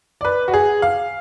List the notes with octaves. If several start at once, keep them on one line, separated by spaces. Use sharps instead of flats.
D5
B4
F#4
G#4
F5